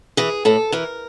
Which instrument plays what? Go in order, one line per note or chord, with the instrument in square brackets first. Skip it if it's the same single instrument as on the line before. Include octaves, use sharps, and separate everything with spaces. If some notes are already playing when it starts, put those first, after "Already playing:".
[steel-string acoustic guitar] E3 G#4
A2 A4
E3 A#4